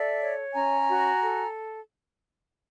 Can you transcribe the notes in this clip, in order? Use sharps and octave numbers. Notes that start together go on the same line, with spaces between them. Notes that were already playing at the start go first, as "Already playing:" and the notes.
Already playing: A4 D5 E5
C#5
C#4 G#5 A#5
F#4
A4